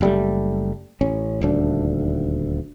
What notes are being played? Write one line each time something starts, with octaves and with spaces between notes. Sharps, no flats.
F#1 G3 A3
A1 C#4
D#1 D2 D4